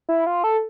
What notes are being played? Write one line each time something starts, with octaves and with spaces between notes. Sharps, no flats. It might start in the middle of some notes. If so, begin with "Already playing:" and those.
E4
F4
A4